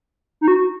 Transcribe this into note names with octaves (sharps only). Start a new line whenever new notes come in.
D#4
F#4